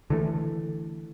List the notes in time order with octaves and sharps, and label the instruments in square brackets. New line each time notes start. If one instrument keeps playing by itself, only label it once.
[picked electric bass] D3 E3 A3